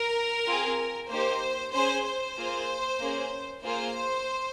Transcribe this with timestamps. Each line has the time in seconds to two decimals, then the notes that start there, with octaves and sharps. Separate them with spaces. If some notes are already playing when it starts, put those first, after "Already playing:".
Already playing: A#4
0.45 C4 F4 G#4
1.09 A#3 D#4 G4 C5
1.72 C#4 G#4 C5
2.04 C5
2.36 A#3 F4 G#4
3.00 A#3 C#4 G#4
3.63 A#3 F4 G#4 C5